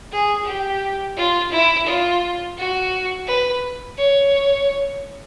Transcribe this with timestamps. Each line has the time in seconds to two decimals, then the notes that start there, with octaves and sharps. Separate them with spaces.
0.12 G#4
0.46 G4
1.17 F4
1.52 E4
1.86 F4
2.58 F#4
3.27 B4
3.98 C#5